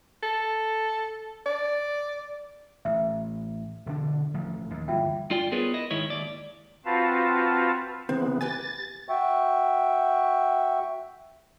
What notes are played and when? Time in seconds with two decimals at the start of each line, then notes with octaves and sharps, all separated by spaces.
0.23 A4
1.46 D5
2.85 A1 E5
3.86 E1 D3 D4
4.34 A1 F3
4.74 D#2
4.88 G1 E3 G3 F4 E5 G5
5.30 G2 F4 D5 G5
5.52 B3 F4 G#4 A#4 B4 C#5
5.74 E4 D#5
5.91 G#2 D#3 E4 C#5
6.10 D#2 D5
6.85 C4 F4 F#4 B4 F5 A5
8.09 C#3 E3 B3 C4
8.41 G4 B4 G#5 A6
9.08 F#4 E5 G5 C#6